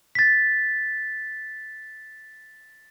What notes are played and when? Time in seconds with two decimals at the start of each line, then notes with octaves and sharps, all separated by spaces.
0.15 A6 B6